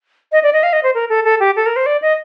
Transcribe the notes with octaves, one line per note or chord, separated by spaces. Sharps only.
D#5
D5
D#5
F5
D#5
C5
A#4
A4
A4
G4
A4
A#4
C5
D5
D#5